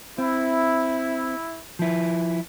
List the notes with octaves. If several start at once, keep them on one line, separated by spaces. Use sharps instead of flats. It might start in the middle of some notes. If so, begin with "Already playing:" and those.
C4 E4
F3 E4